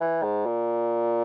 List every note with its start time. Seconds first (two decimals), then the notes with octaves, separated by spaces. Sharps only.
0.01 E3
0.23 G#2
0.46 A#2